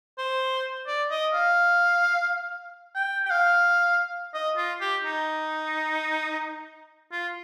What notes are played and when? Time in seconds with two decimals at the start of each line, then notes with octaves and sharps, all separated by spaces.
0.18 C5
0.87 D5
1.11 D#5
1.34 F5
2.95 G5
3.25 G5
3.31 F5
4.34 D#5
4.57 F4
4.81 G4
5.04 D#4
7.12 F4